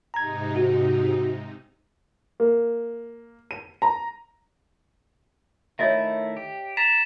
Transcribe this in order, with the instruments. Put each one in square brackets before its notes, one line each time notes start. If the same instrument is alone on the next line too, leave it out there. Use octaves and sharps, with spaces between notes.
[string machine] G#2 C3 D#4 [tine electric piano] A#5 G#6
[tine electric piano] F#4
[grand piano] A#3
D#7
A#5
[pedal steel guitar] D#3 A3 E4 [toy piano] C#5 D#5 E5
[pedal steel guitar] G4
[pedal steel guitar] A#5 [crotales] A6 B6 E7